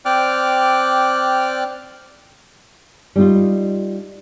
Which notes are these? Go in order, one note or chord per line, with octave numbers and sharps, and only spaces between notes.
C4 D5 G5 D6 F6 F#6
G3 D#4 F4